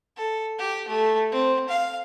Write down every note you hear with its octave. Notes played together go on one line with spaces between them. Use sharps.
A4
G4
A3
C4
F5